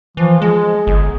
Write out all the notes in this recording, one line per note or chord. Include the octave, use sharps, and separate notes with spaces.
E3 F3
G#3 G#4
G1